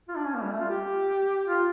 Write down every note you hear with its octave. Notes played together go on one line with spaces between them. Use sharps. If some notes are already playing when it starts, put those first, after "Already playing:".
F4
D4
C#4
A#3
G3
A3
F4
G4
F4